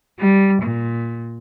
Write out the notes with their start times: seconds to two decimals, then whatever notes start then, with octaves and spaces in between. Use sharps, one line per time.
0.19 G3
0.62 A#2